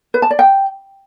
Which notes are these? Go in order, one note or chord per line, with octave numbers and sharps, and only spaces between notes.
B4
A5
D5
G5